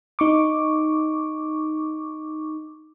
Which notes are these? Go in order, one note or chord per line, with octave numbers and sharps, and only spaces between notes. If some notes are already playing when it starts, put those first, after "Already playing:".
D#4 C#6 D6